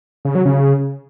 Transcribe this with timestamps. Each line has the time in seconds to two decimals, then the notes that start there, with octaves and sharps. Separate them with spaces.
0.25 C#3
0.35 F#3
0.45 C#3